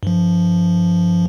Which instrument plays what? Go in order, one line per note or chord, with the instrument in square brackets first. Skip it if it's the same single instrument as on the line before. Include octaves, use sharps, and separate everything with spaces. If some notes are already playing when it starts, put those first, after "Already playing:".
[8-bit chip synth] G2 F3